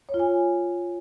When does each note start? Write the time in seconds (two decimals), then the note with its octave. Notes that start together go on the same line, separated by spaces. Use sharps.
0.09 C#5
0.14 F4
0.19 G#5